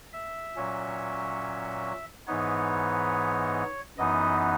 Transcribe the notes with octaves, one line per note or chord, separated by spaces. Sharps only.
E5
A#2 F#3 C#4
G#2 E3 B3 D#4 C#5
F#2 E3 B3 D#4 D#5